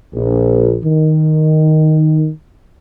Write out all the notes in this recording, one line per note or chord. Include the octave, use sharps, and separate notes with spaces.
A#1
D#3